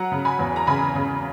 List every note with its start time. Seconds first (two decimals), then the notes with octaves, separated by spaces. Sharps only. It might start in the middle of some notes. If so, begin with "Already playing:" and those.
Already playing: F#3 F#5 A#5
0.12 C#3
0.25 G#5 B5
0.39 E2
0.56 A#5
0.67 C#3 G#5 B5
0.95 C#3